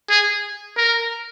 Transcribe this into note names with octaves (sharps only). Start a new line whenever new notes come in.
G#4
A#4